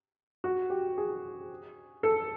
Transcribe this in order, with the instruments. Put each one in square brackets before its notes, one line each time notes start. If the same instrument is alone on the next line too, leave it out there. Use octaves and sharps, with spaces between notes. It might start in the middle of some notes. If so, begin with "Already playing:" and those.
[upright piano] F#4
G4
G#4
A4